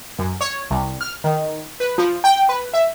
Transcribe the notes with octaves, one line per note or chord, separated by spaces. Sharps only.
F#2
C#5
C2
F6
D#3
B4
F3
G5
B4
E5